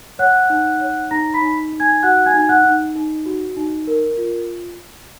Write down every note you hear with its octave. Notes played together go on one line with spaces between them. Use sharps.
C#5 F#5 F#6
D#4
C#5
D#4 A#5 A#6
B5 B6
D#4
D#4
G#5 G#6
F#4 F#5 F#6
G#5 G#6
D#4
F#5 F#6
D#4
D#4
F#4
D#4
A#4
F4